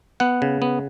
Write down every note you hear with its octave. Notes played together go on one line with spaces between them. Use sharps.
B3 F#5
C#3
B3